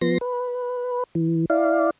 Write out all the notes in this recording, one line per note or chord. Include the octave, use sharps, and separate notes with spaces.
F3 B3 C6 A#6
B4
E3
E4 D5 F5